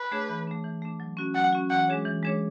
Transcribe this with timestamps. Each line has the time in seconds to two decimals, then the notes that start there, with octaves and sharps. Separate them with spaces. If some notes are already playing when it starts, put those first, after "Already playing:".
Already playing: B4
0.12 A3 D4 G#4 C#5
0.29 E3
0.47 A3 D4
0.64 E3
0.82 A3 D4
1.00 F#3
1.17 C#4 F#4
1.35 F#3 F#5
1.53 C#4 F#4
1.70 E3 F#5
1.88 G#3 D4 G#4 C#5
2.05 E3
2.23 G#3 D4 G#4 C#5